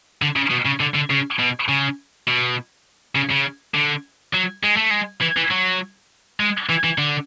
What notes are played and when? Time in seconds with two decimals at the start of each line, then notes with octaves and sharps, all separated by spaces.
0.22 D3
0.36 C#3
0.51 B2
0.66 C#3
0.81 D3
0.95 D3
1.10 C#3
1.39 B2
1.69 C#3
2.27 B2
3.16 C#3
3.31 C#3
3.75 D3
4.33 F#3
4.63 G#3
4.77 A3
4.91 G#3
5.21 E3
5.37 E3
5.51 F#3
6.40 G#3
6.69 E3
6.84 E3
6.98 D3